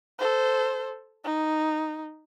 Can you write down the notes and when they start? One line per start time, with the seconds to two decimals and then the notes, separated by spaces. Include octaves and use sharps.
0.19 A4 C5
1.24 D#4